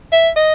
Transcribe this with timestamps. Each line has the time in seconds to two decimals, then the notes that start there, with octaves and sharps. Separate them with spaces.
0.12 E5
0.36 D#5